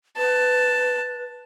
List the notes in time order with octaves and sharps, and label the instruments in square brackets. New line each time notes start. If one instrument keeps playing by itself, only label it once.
[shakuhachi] B4 [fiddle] A5